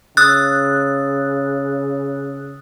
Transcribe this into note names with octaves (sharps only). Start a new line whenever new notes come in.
C#3 D#6 E6 F#6 A6